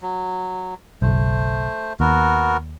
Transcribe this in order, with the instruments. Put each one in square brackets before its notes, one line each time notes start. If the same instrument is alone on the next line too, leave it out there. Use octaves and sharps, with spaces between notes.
[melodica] F#3
[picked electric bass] F#1 B1 [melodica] A3 C5
[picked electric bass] D#2 [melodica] B3 F#4 A#4